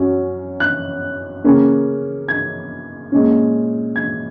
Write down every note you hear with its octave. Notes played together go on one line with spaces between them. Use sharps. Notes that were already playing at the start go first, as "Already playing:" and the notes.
Already playing: F#2 F#3 C#4
F#6
C#3 A#3 C#4
G#6
A#2 G#3 C#4
G#6